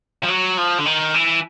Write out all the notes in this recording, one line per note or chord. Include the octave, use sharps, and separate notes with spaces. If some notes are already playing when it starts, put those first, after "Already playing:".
F3
F#3
F3
D3
D#3
E3